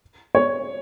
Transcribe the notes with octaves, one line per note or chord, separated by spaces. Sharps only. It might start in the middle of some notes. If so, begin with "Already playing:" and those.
C#5